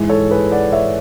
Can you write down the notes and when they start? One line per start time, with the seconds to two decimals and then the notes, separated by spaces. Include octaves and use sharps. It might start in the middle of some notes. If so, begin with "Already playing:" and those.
Already playing: G#2 E3 G#3
0.09 A4 C#5
0.31 G#4 B4
0.51 D5 F#5
0.72 C#5 E5